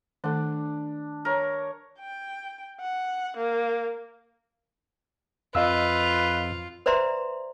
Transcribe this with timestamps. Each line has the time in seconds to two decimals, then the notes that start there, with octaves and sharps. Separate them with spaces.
0.24 D#3 A3 D4 A4
1.25 A#4 C#5
1.99 G5
2.80 F#5
3.37 A#3
5.55 F2 F4 B4 D#5 F5 E6
6.86 B4 C5 D5 E5 A#5 C6